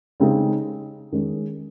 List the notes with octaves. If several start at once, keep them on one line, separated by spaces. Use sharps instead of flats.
C#3 G#3 C4 D#4 G#4
D#3 G#3 C#4